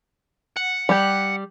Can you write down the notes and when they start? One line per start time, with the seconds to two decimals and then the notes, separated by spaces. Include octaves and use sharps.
0.57 F#5
0.89 G3 G4